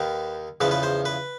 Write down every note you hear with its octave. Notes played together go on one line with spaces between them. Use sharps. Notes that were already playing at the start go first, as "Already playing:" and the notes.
Already playing: D#2 D#3 B4
E2 C#3 F3 B4
B4
C5
B4